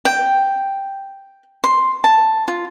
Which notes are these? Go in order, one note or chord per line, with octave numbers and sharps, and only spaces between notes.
G5
C6
A5
F4